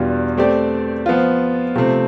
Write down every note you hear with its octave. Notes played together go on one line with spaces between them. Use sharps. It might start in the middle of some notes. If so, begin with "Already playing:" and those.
Already playing: E2 B2 G3 D4 F4
A3 C4 G4 D5
F3 B3 F4
C3 F3 A3 C4